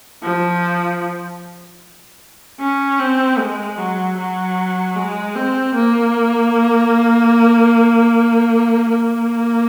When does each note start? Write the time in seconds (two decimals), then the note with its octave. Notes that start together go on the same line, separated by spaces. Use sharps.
0.23 F3
2.60 C#4
2.99 C4
3.38 G#3
3.78 F#3
4.17 F#3
4.95 G#3
5.35 C4
5.74 A#3
8.89 A#3